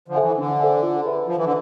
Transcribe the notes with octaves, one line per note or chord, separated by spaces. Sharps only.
D3 F3
A4 C5 E5 G#5
E3
D3 D4
A4 C5 E5 G#5
F4
G#4 B4 E5 B5
F3 F4
E3
D3